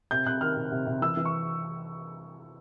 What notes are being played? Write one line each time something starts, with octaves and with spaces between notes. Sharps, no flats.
C3 G6
C3 F#6
D#3 F6
C3
C3
C3
E3 E6
E3
C#6